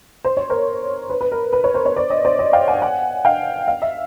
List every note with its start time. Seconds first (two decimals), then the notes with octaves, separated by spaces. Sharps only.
0.24 C5
0.37 C#5
0.50 A#4 C5
1.10 B4
1.21 B4
1.32 A#4
1.53 B4
1.64 B4 C#5
1.74 A#4 C5
1.85 B4 C#5
1.96 C5 D5
2.10 C#5 D#5
2.25 C5 D5
2.39 C#5 D#5
2.53 F5 G5
2.68 F#5 G#5
2.82 F#5 G#5
3.25 F5 G5
3.68 F5
3.82 E5